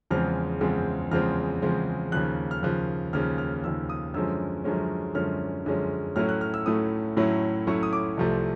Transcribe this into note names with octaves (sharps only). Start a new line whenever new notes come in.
E2 C#3 F3 G#3 C4 F6
E2 C#3 F3 G#3 C4
E2 C#3 F3 G#3 C4 F6
E2 C#3 F3 G#3 C4
D#2 C#3 F3 F#6
F6
D#2 C#3 F3 F#6
D#2 C#3 F3 F6
F6
D#2 C#3 F3 E6
D#6
F#2 D3 F3 G#3 C#4 E6
F#2 D3 F3 G#3 C#4
F#2 D3 F3 G#3 C#4 F6
F#2 D3 F3 G#3 C#4
A2 F#3 A3 C#4 E4 F6
F#6
F6
E6
A2 F#3 A3 C#4 E4 D#6
A2 F#3 A3 C#4 E4
A2 F#3 A3 C#4 E4 C#6
D#6
D6
C2 C3 F3 A3